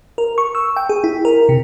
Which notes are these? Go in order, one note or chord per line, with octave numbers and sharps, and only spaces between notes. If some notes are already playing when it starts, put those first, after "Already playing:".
A#4
C#6
E6
G5
G#4
E4
A#4
C3